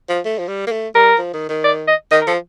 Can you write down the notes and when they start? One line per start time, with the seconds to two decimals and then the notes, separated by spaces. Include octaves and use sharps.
0.09 F3
0.25 A3
0.38 F3
0.48 G3
0.67 A#3
0.72 A3
0.95 G3 A#4
1.18 F3
1.34 D#3
1.49 D#3
1.64 D5
1.88 D#5
2.11 D#3 D#5
2.21 A#4
2.27 F3 A4